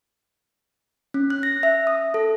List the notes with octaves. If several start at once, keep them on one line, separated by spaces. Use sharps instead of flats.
C#4
F#6
A#6
E5
D#6
A4